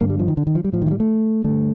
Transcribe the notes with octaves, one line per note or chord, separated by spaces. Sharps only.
G2 D3 A#3
G3
F3
D#3
D3
D#3
F3
G3
A2 F3
D#3
F3
G3
A3
G2 D3 A3